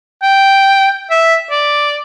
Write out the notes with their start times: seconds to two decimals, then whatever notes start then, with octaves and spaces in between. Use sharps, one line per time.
0.23 G5
1.10 E5
1.51 D5